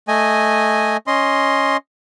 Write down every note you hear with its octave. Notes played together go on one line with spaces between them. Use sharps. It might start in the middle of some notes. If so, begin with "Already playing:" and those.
A3 D#5 G#5
C#4 D#5 C6